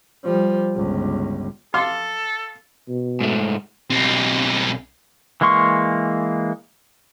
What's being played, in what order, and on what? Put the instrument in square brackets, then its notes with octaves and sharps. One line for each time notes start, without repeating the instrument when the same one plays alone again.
[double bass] F3 G3
G1 C#2
[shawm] A4 [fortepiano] F5 C6 D6
[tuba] B2
[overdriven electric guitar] G#2 A3
[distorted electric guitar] B1 C4
[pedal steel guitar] E3 G#3 A#3 C6 C#6